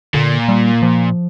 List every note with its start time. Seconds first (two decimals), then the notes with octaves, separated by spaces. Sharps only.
0.14 A#2 D3
0.49 G3
0.82 F3